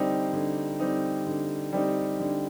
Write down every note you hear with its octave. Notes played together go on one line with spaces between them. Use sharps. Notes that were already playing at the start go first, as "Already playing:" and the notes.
Already playing: D3 G3 C4 D#4
D3
G3 C4 D#4
D3
G3 C4 D#4
D3